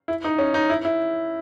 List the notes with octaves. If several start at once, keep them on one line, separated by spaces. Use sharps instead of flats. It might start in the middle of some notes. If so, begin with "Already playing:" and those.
E4
D#4
C#4
D#4
E4
E4